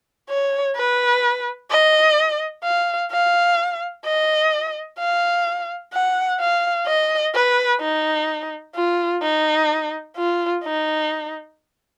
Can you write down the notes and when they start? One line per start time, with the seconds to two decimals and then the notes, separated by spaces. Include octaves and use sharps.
0.29 C#5
0.76 B4
1.70 D#5
2.64 F5
3.12 F5
4.05 D#5
4.99 F5
5.93 F#5
6.40 F5
6.87 D#5
7.34 B4
7.81 D#4
8.75 F4
9.22 D#4
10.16 F4
10.64 D#4